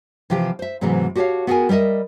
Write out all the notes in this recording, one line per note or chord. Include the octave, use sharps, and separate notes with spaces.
C3 E3 F3 G4 G5
C5 E5
G#2 C3 E3 F#3 G#3 A3
F#4 G4 A4 C5 C#5 F5
B3 F#4 G#4 A#4 G5 G#5
G3 A#4 C#5 D#5 E5